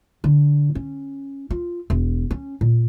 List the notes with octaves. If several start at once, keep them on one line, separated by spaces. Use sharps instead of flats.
D3
C#4
F4
E1
C#4
A#2